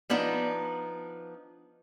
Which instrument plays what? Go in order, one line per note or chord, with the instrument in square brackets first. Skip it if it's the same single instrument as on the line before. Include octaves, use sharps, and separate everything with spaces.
[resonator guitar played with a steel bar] F3 B3 D4 D#4